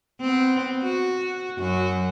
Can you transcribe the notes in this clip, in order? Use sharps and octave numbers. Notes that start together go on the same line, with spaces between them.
B3 C4
F#4
F#2 F#4